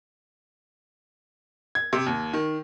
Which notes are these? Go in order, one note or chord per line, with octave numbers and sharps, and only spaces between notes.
G#6
C3
D#2
D#3